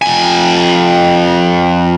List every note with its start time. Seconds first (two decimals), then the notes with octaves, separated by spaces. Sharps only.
0.02 F2 G#5